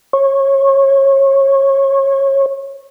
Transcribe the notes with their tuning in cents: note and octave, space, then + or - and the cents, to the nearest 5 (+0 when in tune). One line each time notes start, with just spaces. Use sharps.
C#5 -25